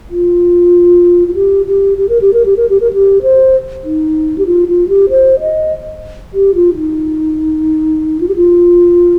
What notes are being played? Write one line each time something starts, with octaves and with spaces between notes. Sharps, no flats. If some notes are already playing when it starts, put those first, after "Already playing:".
F4
F4
G4
G4
G4
A#4
G4
A#4
G4
A#4
G4
A#4
G4
C5
D#4
G4
F4
F4
G4
C5
D#5
G4
F4
D#4
F4
G4
F4